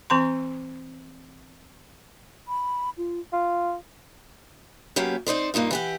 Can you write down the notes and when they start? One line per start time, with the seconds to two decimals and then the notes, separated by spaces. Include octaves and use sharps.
0.10 E3 C4 A#5 C6
2.48 B5
2.97 F4
3.33 F4
4.96 F#3 A#3 B3 C#4 G4
5.27 C4 D#4 C5 D5
5.54 G2 A#3 D#4 F4
5.71 E3 G4 F#5